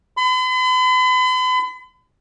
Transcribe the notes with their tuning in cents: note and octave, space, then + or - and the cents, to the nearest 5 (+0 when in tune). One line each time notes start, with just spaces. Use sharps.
B5 +45